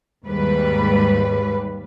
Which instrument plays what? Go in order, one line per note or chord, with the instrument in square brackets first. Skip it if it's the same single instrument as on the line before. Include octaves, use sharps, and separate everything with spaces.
[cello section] D#2 G#2 G3 B4